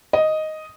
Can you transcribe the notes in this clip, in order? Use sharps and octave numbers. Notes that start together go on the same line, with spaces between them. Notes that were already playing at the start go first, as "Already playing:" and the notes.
D#5